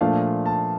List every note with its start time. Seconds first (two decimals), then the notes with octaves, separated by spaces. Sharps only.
0.01 A#2 F3 A3 D4 F5
0.46 A5